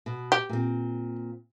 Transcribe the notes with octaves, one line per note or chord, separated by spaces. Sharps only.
B2
G4
A#2 C4